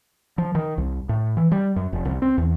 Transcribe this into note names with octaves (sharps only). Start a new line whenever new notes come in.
F3
D#3
C2
A2
E3
G3
F#2
F1
C2
C4
E2